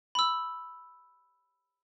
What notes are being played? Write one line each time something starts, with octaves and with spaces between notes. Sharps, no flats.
B5 E6